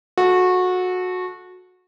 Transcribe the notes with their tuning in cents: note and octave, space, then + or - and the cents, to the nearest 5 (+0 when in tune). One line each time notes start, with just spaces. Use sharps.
F#4 -20 A4 -15